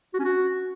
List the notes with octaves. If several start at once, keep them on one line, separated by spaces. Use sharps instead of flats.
F#4
C#4
F#4